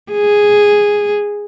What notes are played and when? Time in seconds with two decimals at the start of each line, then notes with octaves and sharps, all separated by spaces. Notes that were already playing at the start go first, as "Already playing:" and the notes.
0.12 G#4